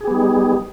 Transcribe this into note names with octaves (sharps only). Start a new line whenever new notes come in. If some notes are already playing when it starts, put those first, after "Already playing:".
G3 B3 D#4 G4 G#4